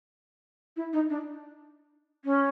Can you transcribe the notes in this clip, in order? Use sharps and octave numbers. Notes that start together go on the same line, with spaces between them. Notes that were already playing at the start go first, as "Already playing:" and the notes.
E4
D#4
D4
C#4